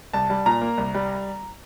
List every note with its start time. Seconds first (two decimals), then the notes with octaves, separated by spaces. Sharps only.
0.13 C2 A5
0.30 G3
0.46 A#2 A#5
0.62 A#3
0.78 C2
0.94 G3